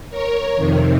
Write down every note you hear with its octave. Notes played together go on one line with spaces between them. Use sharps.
A#4 C#5
F2 C3 D#3